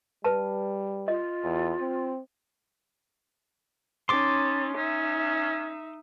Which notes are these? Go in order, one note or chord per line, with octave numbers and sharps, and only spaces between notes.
G3 B4 A5
F4 D#5
E2
C4
C#4 D#4 A5 C6 D6
C#4 D#4 E5